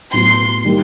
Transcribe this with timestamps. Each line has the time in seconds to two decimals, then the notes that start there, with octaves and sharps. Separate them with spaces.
0.13 A2 F#3 B3 C6
0.65 D#3 G3 A#3 D#4